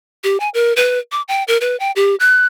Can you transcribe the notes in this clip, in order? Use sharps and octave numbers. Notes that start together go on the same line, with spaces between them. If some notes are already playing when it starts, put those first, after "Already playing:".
G4
G#5
A#4
B4
D6
G5
A#4
B4
G5
G4
F#6